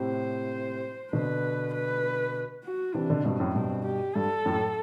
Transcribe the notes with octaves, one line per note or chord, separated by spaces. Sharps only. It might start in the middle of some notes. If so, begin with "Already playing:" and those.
Already playing: A2 C3 C5
B2 D3 B4
B4
F#4
C3 E3 D4
B2 D3
G2 B2 C4
F#2 A2
G2 B2 C4
G4
G2 A4
F#2 A2